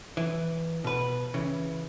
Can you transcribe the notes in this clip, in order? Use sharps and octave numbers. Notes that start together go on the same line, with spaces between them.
E3
B2 B4
C#3 E3